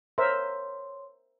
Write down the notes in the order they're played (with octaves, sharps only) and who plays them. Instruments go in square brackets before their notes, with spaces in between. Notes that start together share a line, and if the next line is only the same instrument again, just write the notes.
[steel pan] A#4 C5 E5 [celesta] C#5 C6